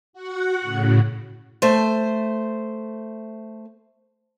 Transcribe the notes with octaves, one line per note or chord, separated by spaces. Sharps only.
F#4 F#5
A2 C#3
A3 C5